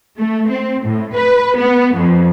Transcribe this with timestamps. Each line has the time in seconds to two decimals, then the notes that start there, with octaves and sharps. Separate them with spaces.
0.17 A3
0.48 C4
0.84 A2
1.13 B4
1.55 B3
1.94 F2